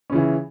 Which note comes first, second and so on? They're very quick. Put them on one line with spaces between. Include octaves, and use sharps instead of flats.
C#4 C#3 E3 E4